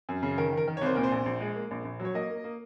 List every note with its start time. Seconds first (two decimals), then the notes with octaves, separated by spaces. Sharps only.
0.09 F#2
0.23 C#3
0.38 D#3 A#4
0.52 D#3 A#4
0.68 D#3
0.77 C#5
0.81 C2 C5
0.95 A#2 A#4
1.04 C5
1.12 A#1
1.26 A#1
1.40 G#3
1.55 A#3
1.71 A#1
1.85 A#1
2.00 F#3
2.05 C#5
2.14 A#3 D#5
2.30 A#3
2.44 A#3